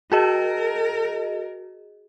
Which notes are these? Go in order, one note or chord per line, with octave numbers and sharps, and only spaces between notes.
F#4 G#4 A#4 D#5